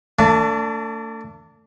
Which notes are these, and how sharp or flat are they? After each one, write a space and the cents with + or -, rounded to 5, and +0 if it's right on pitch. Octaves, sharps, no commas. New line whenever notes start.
A3 +35 D4 -20